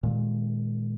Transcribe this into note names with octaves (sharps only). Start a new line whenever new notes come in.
A#2 D#3 G#3